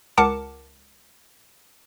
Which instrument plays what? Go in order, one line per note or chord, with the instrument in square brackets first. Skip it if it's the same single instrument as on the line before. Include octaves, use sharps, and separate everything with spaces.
[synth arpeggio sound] C#2 A#4 F#5 A5 D6 C#7